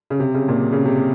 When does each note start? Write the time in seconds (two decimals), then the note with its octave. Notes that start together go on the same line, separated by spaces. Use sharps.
0.10 C#3
0.20 C3
0.34 C#3
0.49 A#2
0.72 C#3
0.85 C3